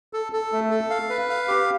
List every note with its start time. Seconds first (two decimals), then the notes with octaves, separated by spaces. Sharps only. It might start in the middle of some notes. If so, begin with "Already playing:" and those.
0.13 A4
0.33 A4
0.52 A3
0.71 A4
0.90 F5
1.09 B4
1.30 F5
1.48 G4